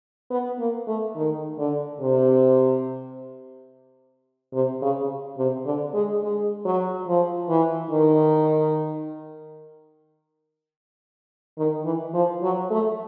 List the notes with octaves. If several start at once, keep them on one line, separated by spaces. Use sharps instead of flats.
B3
A#3
A3
D#3
D3
C3
C3
C#3
C3
D3
G#3
G#3
F#3
F3
E3
D#3
D#3
E3
F3
F#3
A3